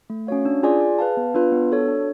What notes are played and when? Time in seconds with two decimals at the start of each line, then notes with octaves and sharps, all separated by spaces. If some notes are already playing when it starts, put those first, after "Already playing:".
0.10 A3
0.27 C#4 F#4 C#5 F5
0.45 D4
0.63 F4 G#4 D5 G#5
0.81 G#4
0.99 B4 F5 A5
1.17 B3
1.34 D4 F4 B4 F5
1.52 B3
1.70 D4 F#4 A4 C#5
1.88 D4